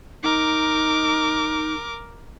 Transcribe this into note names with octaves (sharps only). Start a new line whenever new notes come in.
D#4 A#4 D6